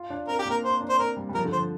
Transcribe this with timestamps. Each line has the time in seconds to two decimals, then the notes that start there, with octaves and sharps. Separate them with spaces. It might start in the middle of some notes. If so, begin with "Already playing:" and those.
Already playing: F4
0.10 D4
0.27 C4 A#4
0.39 G4
0.45 A#3
0.50 A#4
0.63 C4 C5
0.81 D4
0.89 C5
0.99 C4 A#4
1.17 G3
1.29 G3
1.35 F3 A#4
1.45 D3
1.52 F3 C5